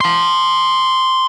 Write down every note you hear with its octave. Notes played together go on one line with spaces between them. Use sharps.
A5 C6